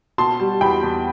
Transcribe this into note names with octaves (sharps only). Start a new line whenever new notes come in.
B2 A5 C6
G3
E2 G5 B5
E2